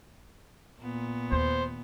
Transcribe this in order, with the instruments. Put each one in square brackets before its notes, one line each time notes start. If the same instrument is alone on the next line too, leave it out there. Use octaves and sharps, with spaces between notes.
[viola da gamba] A#2 B3
[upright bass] D#2 [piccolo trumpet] C5